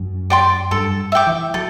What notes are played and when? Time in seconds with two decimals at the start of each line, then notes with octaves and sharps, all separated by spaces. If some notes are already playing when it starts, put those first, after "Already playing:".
Already playing: F#2
0.30 D5 G5 C6
0.71 G2 A4
1.12 E5 G5 D6
1.27 E3
1.54 F#3 A4